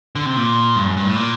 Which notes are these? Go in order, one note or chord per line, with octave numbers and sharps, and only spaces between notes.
D3
C3
A#2
G2
F#2
G2
A2
A#2